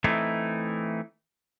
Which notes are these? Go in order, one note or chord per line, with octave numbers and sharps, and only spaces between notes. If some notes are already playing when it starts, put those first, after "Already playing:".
E3 A3 C4 D#4 E4